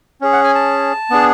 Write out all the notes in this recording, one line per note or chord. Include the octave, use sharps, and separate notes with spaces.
C#4 G#4
F#5
G#5
A5
B3 D4 G#4